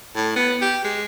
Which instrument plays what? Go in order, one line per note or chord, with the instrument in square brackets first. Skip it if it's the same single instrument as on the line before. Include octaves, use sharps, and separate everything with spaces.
[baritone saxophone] A2
B3
G4
G#3